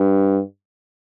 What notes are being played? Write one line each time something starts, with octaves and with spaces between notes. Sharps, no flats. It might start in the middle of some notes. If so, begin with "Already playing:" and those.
Already playing: G2